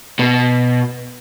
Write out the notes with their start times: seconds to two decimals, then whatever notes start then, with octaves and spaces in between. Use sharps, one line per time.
0.19 B2